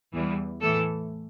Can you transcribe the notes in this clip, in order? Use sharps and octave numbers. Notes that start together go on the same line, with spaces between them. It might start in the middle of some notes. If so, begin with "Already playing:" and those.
E2 E3 G3
A2 E3 A3 A4